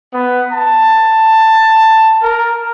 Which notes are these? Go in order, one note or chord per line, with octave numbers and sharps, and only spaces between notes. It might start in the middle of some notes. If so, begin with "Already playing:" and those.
B3
A5
A#4